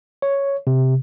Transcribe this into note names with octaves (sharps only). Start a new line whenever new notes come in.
C#5
C3